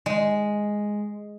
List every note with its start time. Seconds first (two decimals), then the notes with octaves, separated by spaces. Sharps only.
0.06 G#3